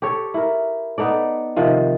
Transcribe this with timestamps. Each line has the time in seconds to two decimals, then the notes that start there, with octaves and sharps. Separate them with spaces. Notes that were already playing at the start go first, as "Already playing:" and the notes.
0.02 G4 A4 C#5
0.34 E4 A#4
0.98 B3 D#4 A4 D5
1.56 C3 D#3 F3